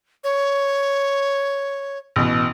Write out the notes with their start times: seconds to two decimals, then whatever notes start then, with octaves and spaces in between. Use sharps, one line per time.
0.24 C#5
2.16 A1 B2